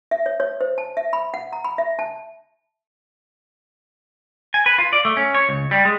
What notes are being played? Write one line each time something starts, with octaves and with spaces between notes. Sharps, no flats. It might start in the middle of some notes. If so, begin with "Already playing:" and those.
E5
C#5
C#5
C5
A5
E5
B5
F#5
A#5
B5
E5
A5
G#5
B4
F4
D5
A3
C#4
C#5
C#2
G3
G#3